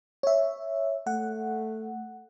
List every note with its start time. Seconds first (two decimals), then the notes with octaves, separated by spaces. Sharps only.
0.23 C#5 E5
1.07 A3 F#5